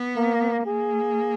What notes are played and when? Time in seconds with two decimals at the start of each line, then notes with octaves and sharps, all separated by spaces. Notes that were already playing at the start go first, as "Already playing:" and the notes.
Already playing: B3
0.16 A#3
0.66 A#3 G#4